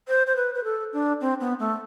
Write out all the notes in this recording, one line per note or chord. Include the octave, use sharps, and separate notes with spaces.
C5
C5
B4
B4
A4
D4
C4
B3
A3